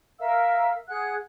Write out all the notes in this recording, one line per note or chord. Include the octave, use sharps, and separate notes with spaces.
A#4 E5 F5 E6
G#4 F#5 F#6